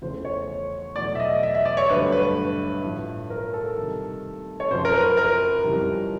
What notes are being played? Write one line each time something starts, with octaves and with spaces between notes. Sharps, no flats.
E2 C#3 F3 A3 C5
C#5
E2 B2 F#3 A3 D5
E5
D#5
E5
E5
D5
C#5
G2 D3 F#3 A3 B4
B4
A2 F3 A3
A#4
A4
C3 D#3 G3
C#5
F#2 C#3 F3 C5
A#4
B4
A#4
F2 C#3 E3 G3